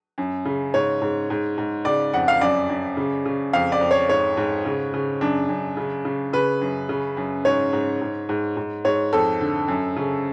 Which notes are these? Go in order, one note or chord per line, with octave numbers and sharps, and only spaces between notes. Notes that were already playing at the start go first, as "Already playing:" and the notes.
F#2
C#3
G#2 C#5
G#2
G#2
G#2
C#3 D5
F2 F#5
F5
F#2 D5
F#2
C#3
C#3
F2 F5
D5
F2
C#5
G#2 C#5
G#2
C#3
C#3
F#2 D4
F#2
C#3
C#3
C#3 B4
F#2
C#3
F#2
G#2 C#5
G#2
G#2
G#2
G#2
G#2 C#5
F2 A4
D3
F#2
C#3